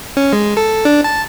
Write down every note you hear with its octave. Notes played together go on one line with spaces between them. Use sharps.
C#4
G#3
A4
D4
A5